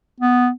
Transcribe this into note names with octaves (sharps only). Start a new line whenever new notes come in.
B3